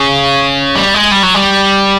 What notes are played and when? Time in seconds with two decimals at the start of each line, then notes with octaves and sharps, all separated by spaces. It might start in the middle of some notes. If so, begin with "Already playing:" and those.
Already playing: C#3
0.76 G3
0.94 G#3
1.12 G3
1.23 F#3
1.34 G3